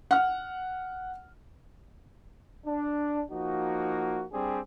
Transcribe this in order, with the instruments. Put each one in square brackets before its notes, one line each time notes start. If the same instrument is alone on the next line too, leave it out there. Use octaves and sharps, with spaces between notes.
[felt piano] F#5 F6
[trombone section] D4
F3 A#3 D#4 F#4
G3 C4 D4 G4 G#4